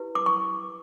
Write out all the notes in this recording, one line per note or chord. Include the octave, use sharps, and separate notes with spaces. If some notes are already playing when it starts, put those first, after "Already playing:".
Already playing: E4 G4 B4
D6
C#6